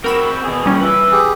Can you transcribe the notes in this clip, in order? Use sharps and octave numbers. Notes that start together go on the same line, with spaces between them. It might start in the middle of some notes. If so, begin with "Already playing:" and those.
C4 F#4 A#4 B5 E7
B2 G#4
A#2 C#3 G3 C#4
B4 E5
G4 G#4